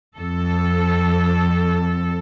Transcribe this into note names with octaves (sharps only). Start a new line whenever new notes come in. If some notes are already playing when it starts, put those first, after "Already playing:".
F2 A4